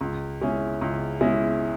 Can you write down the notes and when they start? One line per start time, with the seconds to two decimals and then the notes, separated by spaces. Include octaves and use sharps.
0.01 C#2
0.41 B2 G#3 C#4 E4
0.81 C#2
1.21 B2 G#3 C#4 E4